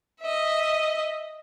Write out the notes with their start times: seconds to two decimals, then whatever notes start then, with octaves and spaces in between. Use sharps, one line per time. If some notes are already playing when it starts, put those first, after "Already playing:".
0.21 D#5 E5